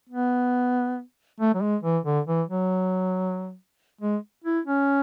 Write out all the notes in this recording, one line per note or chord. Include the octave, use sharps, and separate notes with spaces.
B3
A3
F#3
G#3
E3
D3
E3
F#3
G#3
E4
C#4